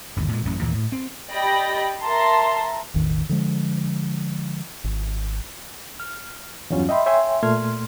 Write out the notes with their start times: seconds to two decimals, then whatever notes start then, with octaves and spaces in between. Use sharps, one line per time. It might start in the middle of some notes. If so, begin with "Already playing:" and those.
0.16 G1 D#2
0.32 A#2 G#3
0.45 A1 F#2 C#4
0.61 D#2 A#2 E3 A#3
0.74 A2
0.92 C4
1.31 G4 D5 D#5 G5 B5 A#6
2.03 A#4 E5 A5 A#5 C6
2.94 E1 A1 D#3
3.29 D3 F3 G#3
4.84 G#1
6.00 F6
6.70 E2 G2 F#3 C#4 F4
6.89 D#5 E5 G5 B5 C6
7.06 C#5 E5 G5 G#5 C6
7.43 A#2 A3 C6 F6 G#6